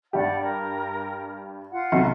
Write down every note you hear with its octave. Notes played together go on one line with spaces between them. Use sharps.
G2 G4 D5 F#5
A#4
F4 F#5
B1 C3